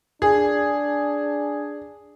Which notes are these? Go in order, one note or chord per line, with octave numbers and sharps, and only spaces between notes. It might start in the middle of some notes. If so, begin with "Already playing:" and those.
D4 G#4